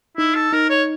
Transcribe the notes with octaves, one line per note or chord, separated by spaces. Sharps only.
D#4 E4
A4
D#4 A#4
C#5